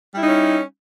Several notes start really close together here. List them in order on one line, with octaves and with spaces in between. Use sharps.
G3 E4 D#4 C#4